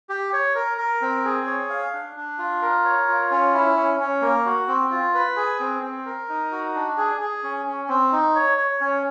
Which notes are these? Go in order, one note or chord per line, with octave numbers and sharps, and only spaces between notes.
G4
C#5
A#4
A#4
C4
G#4
C#5
F5
D4
D4
F4
A#4
C#5
F4
C#4
E4
C#4
C#4
A#3
F#4
C4
F4
B4
G#4
C4
C4
A#4
D#4
F#4
D4
G#4
G#4
C#4
C#4
C4
D#4
C#5
C#5
C#4